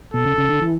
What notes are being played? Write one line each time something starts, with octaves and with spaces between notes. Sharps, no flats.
B2 A4
C#3
C#3
D3
E3